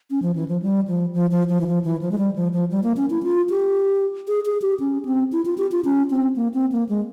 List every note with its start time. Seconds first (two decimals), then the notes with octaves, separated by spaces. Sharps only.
0.10 C#4
0.22 F3
0.36 E3
0.48 F3
0.62 G3
0.88 F3
1.14 F3
1.31 F3
1.49 F3
1.61 E3
1.67 F3
1.84 E3
2.02 F3
2.11 G#3
2.18 G3
2.36 F3
2.53 F3
2.71 G3
2.83 A#3
2.97 C#4
3.10 E4
3.23 F4
3.50 G4
4.28 G#4
4.46 G#4
4.62 G4
4.80 C#4
5.05 C4
5.32 E4
5.45 F4
5.58 G4
5.72 F4
5.85 C#4
6.11 C4
6.36 A#3
6.54 C4
6.72 A#3
6.89 G#3